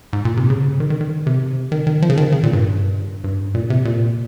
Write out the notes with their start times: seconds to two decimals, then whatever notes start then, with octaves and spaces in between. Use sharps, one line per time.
0.13 G#2
0.25 A#2
0.37 C3
0.50 C#3
0.80 D#3
0.90 D#3
1.01 D#3
1.27 C3
1.72 D#3
1.87 D#3
2.02 F3
2.10 C#3
2.17 D#3
2.32 C#3
2.43 A#2
2.53 G2
3.24 G2
3.55 A#2
3.70 C3
3.85 A#2